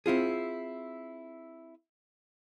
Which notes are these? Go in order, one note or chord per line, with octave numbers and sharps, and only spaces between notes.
C4 E4 F4 G#4